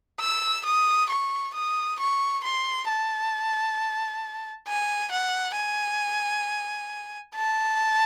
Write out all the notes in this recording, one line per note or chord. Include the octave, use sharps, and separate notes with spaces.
E6
D#6
C#6
D#6
C#6
C6
A5
G#5
F#5
G#5
A5